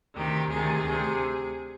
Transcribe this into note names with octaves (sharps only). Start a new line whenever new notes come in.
D2 C3 D#3 G4
D2 C3 D#3 G#4
D2 C3